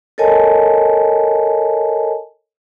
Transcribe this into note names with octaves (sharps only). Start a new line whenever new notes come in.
A4 A#4 C#5 D#5 G#5 A5